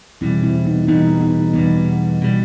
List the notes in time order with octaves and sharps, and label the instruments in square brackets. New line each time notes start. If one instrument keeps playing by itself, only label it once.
[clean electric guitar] E2 B2 G3 [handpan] C4 E4
[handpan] C4 E4
B3 D#4
[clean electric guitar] E2 B2 G3 [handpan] B3 D#4
[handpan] B3 D#4
[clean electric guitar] E2 B2 G3 [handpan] B3 D#4
[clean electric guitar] B2 G3